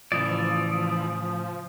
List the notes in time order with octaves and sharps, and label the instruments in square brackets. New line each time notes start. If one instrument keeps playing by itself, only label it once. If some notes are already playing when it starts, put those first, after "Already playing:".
[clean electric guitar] A2 C#3 [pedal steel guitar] E3 D5 [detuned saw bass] F3 [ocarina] D#6